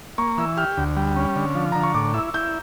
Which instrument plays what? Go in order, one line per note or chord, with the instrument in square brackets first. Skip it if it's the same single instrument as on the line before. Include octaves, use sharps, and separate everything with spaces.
[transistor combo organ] A#3 [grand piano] C#6
[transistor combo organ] E3 [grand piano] E6
[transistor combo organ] G4 [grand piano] F6
[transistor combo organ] D2
G3
C#4
D3
F3
[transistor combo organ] D3 [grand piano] A#5
[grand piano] C#6
[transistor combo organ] A2 [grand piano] D6
[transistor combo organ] E4 [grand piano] E6
[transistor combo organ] E4 [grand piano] G6